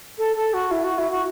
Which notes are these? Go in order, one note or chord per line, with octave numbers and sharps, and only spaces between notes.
A4
A4
F#4
E4
F#4
E4
F#4